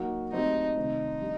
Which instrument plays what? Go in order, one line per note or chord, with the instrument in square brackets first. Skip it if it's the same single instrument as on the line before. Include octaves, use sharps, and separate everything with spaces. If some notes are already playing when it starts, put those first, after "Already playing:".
Already playing: [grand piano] F#3 A#3 D#4 F#4
[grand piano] F#3 A3 C4 G4 [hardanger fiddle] D#4
[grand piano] C3 D#3 A3 C4 [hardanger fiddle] D#4
[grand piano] G3 D4 G4